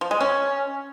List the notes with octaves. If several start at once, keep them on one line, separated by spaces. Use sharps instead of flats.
F3
G#3
C#4